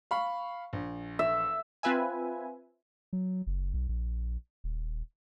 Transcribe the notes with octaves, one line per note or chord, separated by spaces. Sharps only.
F5 B5 C#6
A#1
E5
C4 F4 B4 E5 G#5
F#3
F#1
B1
A#1
D#1